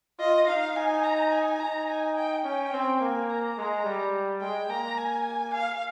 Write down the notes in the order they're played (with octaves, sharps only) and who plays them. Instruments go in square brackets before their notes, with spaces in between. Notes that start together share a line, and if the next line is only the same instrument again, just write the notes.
[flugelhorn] F4 [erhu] D#5
[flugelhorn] D#4 [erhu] F5
[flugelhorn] D#4 [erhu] G#5
[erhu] A#5
G#5
[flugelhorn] D#4 [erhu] A#5
[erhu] G#5
G5
[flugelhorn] C#4 [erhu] G5
[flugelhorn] C4
[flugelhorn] A#3 [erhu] G#5
[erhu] A#5
[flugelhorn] G#3
G3
[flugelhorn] G#3 [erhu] G5
[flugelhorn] A#3 [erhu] A#5
[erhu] G#5
F5